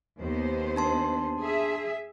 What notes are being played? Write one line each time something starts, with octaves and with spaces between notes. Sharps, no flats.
D#2 B3 C5
D4 A5 C6
G#4 E5